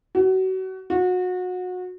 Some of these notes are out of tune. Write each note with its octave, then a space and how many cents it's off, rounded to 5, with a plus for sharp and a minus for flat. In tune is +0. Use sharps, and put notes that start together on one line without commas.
F#4 +30
F#4 -25